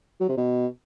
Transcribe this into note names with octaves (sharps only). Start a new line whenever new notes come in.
F#3
C3
B2